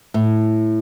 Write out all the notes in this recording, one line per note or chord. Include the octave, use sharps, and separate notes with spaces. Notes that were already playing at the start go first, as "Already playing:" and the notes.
A2